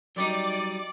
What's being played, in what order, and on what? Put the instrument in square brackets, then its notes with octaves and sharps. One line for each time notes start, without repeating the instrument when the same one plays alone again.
[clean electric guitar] F#3 G3 D#4 [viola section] D5